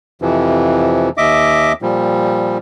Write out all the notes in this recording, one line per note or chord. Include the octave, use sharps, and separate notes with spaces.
F2 C3 E3 F3
D#2 D#5 E5 D6
A#2 F3 G3